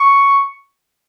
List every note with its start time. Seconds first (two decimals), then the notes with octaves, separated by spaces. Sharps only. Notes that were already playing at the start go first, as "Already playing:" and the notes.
Already playing: C#6